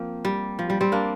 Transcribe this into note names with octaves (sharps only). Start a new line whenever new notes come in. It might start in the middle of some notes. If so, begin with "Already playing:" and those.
Already playing: F3 A#3 C4
G3
F3
G3
G3 C4
A#3 D4